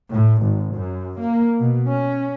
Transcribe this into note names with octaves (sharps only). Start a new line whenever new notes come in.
A2
G#1
F#2
A#3
B2
C#4